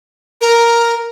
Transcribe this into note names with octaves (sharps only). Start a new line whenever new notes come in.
A#4